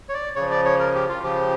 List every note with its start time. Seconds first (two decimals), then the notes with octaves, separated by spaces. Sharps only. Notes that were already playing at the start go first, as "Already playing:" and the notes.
0.09 C#5
0.14 D5
0.36 C#3 F3 C#5
0.51 D5
0.65 C#5
0.79 A#4
0.95 G4
1.09 F4
1.23 C#3 F3 G4